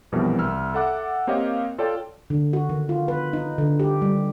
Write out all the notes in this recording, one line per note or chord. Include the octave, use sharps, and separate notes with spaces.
A#1 F2 B2 E3 G3 A#4
C2 E6 F6
A4 E5 F#5 D6 F#6
A#3 C4 G4 C#5 D#5 F5
F4 A4 C#5 D5 G5
D3
F#4
D#3
F4
B4
D#4
D3
G4
G3